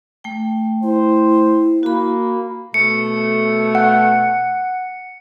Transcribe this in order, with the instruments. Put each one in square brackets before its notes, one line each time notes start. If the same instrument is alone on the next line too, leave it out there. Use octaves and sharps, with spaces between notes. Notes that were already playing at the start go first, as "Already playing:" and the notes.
[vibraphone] A3 G5
[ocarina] E4 [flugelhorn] C5
[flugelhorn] A#3 [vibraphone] F#4 B5
[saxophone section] B2 A3 [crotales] C#7
[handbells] F#5